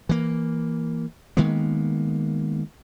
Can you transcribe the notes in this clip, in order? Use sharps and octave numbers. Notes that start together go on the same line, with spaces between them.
E3 A#3
D#3 G#3 A#3 B3